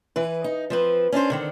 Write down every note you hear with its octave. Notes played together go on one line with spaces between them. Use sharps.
E3 B4
D#4
F3 C4 B4
C#4 D4 E4 C5
D3 D#3 C4